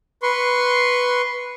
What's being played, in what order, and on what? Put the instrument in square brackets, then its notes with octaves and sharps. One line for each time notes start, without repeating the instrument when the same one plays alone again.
[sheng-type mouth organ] B4 C6 C#6